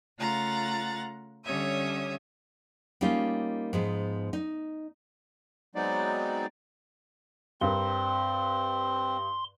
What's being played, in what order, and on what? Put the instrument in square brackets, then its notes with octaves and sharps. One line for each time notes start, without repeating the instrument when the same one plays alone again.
[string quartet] C#3 A3 F4 F#5 A#5 A6
D3 G3 C#4 C#5 E5 D#6
[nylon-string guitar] G3 A#3 C#4 D#4 F4
G#2 F3 B3
D#4
[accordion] F#3 G#3 B3 C4 D#4 D5
[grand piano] G2 A#4 [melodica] C4 [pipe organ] C6